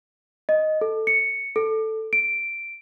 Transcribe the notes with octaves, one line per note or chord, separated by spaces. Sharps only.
D#5
A4
C#7
A4
D7